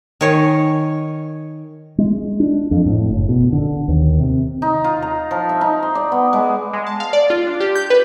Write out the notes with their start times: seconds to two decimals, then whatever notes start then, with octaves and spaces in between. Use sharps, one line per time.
0.21 D#3 C#5 G#5
1.98 G#3
2.40 D4
2.71 F2
2.86 A2
3.10 F#1
3.28 B2
3.52 D3
3.88 D#2
4.20 C3
4.62 D#4
4.84 F4
5.02 A#5
5.31 F3
5.49 E5
5.61 D#4
5.83 C6
5.95 D5
6.12 B3
6.33 G#3
6.73 G#3
6.87 A5
7.00 F5
7.13 D5
7.30 F4
7.47 D4
7.60 G4
7.75 G6
7.90 B4